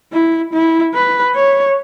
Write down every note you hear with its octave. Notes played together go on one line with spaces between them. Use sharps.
E4
E4
B4
C#5